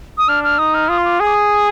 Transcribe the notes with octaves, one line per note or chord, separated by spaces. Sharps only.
D#6
D4 F6
F6
D#4 D#6
F6
F4 D#6
C6
D6
G#4 D#6
D6
D#6